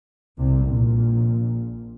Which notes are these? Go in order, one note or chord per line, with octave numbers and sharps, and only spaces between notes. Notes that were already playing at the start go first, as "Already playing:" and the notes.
C2 C3
A#1 A#2